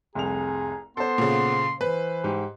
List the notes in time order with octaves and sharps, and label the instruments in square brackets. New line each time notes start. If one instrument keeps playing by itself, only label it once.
[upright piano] F1 C2 F7 [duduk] G#4 [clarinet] A#5
[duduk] B3 [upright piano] A4 C5 [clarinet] C6
[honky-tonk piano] A#2 C#3
[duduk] E3 [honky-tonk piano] B4 [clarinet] C5 [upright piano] B5
[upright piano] G#2 G4